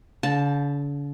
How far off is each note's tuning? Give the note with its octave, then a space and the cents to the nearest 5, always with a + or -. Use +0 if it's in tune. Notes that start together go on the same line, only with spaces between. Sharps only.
D3 -45 A5 +0